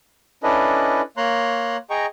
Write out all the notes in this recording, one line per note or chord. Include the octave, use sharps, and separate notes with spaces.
C#4 D4 E4 A4 B4 D#5
A#3 C#5 A#5 C6 F#6
G#4 D#5 G5 A#5 C#6